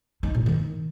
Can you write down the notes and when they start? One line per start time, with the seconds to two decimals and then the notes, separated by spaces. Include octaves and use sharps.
0.23 D#4
0.35 A#2
0.46 D#3